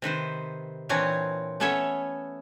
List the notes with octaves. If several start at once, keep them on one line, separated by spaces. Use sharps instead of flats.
C3 D#3 B4 C5
A#2 E3 C4 D4 C#5
A3 B3 C#4 A4 C#5 E5